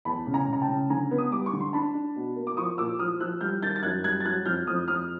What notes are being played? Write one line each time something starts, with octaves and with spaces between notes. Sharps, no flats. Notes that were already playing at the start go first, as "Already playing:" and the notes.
E2 A5 B5
C#3
G#5 A#5
C#3 A#5
G5 A5
C#3
D3 G#5 A#5
B3
D#6
G3 D6
C#6
D3
C6
D4 A5 B5
D4
B2
A#3
D6
F3 C#6 D#6
A#2 D6 E6
F3 D#6 F6
F3 E6 F#6
G3 F6 G6
D#3 G6 A6
A6
F#2 F#6 G#6
G3 F#6 G#6
A6
F#3 F#6 G#6
F2 F6 G6
F2 D#6 F6
F2 D#6 F6